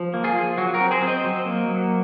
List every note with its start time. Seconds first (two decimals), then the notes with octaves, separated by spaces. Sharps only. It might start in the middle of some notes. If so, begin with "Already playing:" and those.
Already playing: F3
0.14 A#3
0.24 F4 G#4
0.36 F3
0.57 F#3 F#4
0.74 F#4 A#4
0.80 C4
0.91 G#4 C5
1.02 C4
1.08 C5 D#5
1.24 F#3
1.46 A#3
1.68 F#3